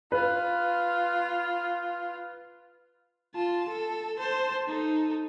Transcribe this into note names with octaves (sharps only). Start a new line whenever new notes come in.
F4 B4
F4 A5
A4
C5 A5
D#4 A4